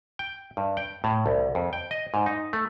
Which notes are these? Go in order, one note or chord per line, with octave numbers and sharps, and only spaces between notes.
G5
G2
G5
A2
C2
F2
G5
D#5
G#2
D#4
A3